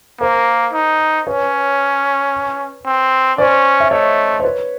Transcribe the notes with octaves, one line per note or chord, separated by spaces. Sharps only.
A#3 A#4 C5
D#4
C#4 B4 C#5
C4
C#4 C5 D5
E5
A3 C#5 D#5
C5
B4 C#5